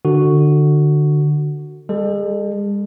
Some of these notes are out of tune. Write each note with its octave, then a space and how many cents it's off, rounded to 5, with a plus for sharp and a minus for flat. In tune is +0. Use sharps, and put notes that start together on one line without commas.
D3 +20 F#4 +0
G#3 -40 A4 +0